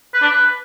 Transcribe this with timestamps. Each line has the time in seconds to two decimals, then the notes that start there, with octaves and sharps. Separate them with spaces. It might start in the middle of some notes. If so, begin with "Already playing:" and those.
0.14 B4
0.22 D4
0.29 B4